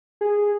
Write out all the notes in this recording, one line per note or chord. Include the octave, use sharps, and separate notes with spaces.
G#4